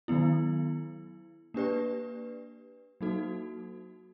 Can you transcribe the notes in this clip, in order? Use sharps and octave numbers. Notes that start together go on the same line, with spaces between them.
D#3 F#3 B3 E4
A#3 D4 G4 B4 D5
F#3 A#3 D#4 F#4 A4